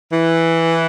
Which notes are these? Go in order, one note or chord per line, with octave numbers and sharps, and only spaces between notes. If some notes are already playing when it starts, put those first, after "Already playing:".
E3